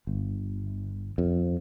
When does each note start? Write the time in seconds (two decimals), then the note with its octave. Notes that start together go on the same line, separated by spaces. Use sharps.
0.07 G1
1.18 F2